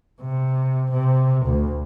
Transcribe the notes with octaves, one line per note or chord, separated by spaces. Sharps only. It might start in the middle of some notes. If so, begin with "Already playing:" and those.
C3
C3
D2